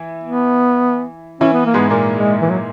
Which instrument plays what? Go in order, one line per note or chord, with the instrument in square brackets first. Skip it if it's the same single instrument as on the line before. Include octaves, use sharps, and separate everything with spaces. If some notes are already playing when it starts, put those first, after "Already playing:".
Already playing: [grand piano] E3 E4
[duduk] B3
[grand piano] E3 E4 [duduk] C#4
[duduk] B3
A#3
[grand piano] G#2 G#3 [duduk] B3
[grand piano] A#2 A#3
[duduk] G#3
E3
F#3